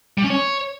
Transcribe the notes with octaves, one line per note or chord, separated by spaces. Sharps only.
G3
C#4
C#5